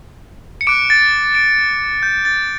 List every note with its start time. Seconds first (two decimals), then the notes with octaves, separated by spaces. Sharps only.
0.61 C#7
0.67 D6 F#6 D7
0.90 A6
1.35 D7
2.03 G6
2.25 A6